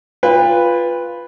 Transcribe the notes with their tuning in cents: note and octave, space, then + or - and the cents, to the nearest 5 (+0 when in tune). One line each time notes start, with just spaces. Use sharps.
F4 +0 B4 +0 G5 +45